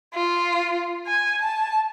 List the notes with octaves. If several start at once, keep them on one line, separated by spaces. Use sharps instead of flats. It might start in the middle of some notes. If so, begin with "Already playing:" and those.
F4
G#5
A5